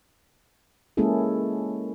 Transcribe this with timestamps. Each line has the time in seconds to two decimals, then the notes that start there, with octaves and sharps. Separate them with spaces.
0.97 G#3 A#3 C#4 E4 G#4 A4